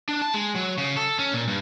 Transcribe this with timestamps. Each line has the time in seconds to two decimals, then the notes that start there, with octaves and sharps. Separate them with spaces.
0.09 D4
0.22 A5
0.34 G#3
0.55 F#3
0.78 C#3
0.97 A4
1.19 C#4
1.33 A#2
1.48 G2